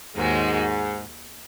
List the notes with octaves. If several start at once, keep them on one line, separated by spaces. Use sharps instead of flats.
D#2 G#2 D#3 G#3 F#4